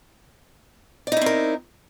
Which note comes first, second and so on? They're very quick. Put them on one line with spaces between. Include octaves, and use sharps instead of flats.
D5 D#4 E4 C4 A#4